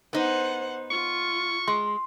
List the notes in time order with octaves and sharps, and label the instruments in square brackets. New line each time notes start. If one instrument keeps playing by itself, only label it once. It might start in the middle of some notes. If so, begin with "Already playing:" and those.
[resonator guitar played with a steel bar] B3 D#4 [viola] C5 F#5
[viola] F4 [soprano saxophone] C#6
[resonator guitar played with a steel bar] G#3 [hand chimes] C6